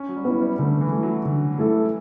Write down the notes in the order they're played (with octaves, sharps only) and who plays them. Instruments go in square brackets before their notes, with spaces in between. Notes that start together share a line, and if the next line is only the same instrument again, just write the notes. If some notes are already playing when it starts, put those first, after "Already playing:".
Already playing: [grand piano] C#4
F#3
G3
[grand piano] F#3 [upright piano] B3 E4
[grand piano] G3
[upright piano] D3 [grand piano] A3
[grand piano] E3
[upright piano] A3 E4
[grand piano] F#3
[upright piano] D3
A3 E4 A4